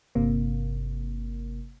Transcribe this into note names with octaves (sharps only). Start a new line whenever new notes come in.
G1 C3 A#3